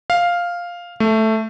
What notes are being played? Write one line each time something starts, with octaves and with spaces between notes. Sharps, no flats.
F5
A3